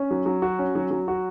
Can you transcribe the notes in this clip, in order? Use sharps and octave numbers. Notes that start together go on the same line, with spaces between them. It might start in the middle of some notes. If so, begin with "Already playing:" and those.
Already playing: C#4
F#3
F#3
F#4
C#4
F#3
F#3
F#4